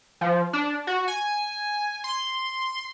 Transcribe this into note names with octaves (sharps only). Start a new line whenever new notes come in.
F3
D4
F#4
G#5
C6